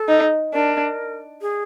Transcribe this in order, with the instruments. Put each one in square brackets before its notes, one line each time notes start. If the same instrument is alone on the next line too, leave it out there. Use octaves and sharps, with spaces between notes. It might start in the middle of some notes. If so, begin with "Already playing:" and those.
Already playing: [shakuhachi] A4
[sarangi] D#4
[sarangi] D4 [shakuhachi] A#4
[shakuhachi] G#4